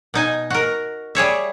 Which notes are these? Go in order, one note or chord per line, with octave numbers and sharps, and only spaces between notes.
B2 D#4 G#5
F#4 A#4
G3 G#4 C#5 E5